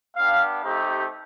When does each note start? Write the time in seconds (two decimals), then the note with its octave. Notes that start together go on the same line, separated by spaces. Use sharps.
0.16 B3 D4 G4 F5
0.63 A3 C4 D#4 G4